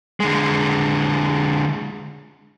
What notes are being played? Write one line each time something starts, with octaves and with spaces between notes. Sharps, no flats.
D3 G#3